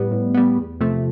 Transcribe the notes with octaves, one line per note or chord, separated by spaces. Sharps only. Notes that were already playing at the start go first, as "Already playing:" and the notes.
Already playing: A2 G3 B3
A2
G3 B3
E2
C3 F3 A3